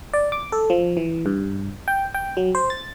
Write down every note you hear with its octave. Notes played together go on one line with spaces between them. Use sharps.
D5
D6
A4
F3
E3
G2
G5
G5
F#3
C5
A6